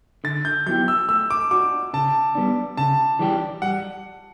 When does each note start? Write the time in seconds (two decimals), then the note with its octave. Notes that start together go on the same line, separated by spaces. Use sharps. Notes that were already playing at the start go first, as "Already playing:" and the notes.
0.24 D3 A6
0.45 G6
0.66 F#3 B3 E4 G4 G6
0.88 E6
1.08 A3 E6
1.31 D6
1.51 D4 F#4 D6
1.93 C#3 A5
2.35 G3 B3 D4
2.77 C#3 A5
3.19 E3 G3 D4 G4
3.62 G3 F#5